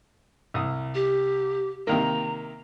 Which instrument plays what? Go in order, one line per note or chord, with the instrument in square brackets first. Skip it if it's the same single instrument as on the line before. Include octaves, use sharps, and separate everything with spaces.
[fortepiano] C2 D#6
[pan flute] G4
[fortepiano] C3 D#3 A#3 [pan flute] A#5